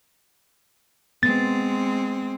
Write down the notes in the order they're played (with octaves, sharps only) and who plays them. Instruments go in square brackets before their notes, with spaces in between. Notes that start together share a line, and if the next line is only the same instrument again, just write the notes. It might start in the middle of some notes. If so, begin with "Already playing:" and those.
[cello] G#3 C4 [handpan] B3 [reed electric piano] A6